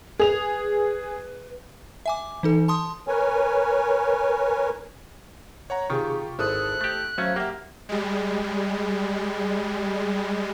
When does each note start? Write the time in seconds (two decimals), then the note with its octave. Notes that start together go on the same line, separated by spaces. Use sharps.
0.19 G#4 B4 F7
2.06 E5 G#5 D6
2.43 E3 D#4 A4
2.68 A5 C6 D#6
3.08 A#4 B4 C#5 G#5
5.70 C#5 F#5 A#5
5.90 C3 D#3 F4 G4 G#4 C#6
6.39 G#1 E4 A4 C5 D#6 F#6
6.81 A3 G4
7.18 F#3 A3 C#4 C5 E5 F5
7.36 A#3 G4 E5 F#5
7.89 G3 G#3